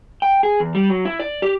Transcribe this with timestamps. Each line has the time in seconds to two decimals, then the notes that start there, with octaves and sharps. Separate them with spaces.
0.22 G5
0.43 G#4
0.60 E2
0.75 G3
0.89 F#3
1.05 E4
1.19 D5
1.42 G4